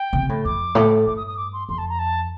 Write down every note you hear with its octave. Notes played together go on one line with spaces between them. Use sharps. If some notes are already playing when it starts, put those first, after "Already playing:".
Already playing: G5
C3
A2
F2 D6
A2
G2 D6
D#6
D#6
D6
C6
F2 C6
A5
A#5
A5